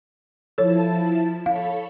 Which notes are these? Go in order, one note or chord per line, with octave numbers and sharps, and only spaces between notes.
F3 E4 A4 C#5 A5
A4 C#5 F5 B5